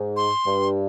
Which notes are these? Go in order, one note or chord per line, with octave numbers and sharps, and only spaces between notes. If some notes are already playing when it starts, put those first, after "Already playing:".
Already playing: G#2
C6
G2